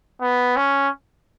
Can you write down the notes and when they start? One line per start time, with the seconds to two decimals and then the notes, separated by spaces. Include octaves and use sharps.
0.21 B3
0.57 C#4